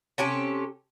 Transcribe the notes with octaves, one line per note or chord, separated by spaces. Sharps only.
C3 C#4 G4 A4